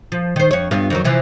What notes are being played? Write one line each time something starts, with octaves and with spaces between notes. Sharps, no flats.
F3
D#3 C5
F2 C#5
G2 B3 F4
F2 D#3 F#3
C3 E3 F3